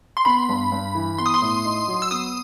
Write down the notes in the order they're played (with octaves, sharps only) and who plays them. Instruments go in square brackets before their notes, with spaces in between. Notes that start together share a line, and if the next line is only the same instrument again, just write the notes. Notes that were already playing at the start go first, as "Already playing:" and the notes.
[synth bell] C6
[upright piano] B3 [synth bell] B5
[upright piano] G2
G2
E3
[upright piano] B3 [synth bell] C6
[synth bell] D#6
C6
[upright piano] A2
D#4
F#3
[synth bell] E6
[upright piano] B3 [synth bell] D#6